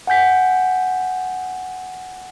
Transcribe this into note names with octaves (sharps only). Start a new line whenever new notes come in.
F#5 G#5 G6 B6